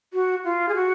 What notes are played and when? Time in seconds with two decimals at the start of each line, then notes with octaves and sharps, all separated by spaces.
0.14 F#4
0.45 F4
0.69 G#4
0.75 F#4